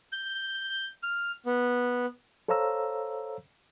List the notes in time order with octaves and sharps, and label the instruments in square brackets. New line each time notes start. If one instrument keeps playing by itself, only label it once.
[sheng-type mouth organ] G6
F6
B3
[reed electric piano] A4 C5 C#5 F5 A#5 E6